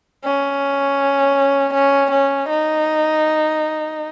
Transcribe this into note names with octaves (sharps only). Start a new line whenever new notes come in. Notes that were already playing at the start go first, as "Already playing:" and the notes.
C#4
C#4
C#4
D#4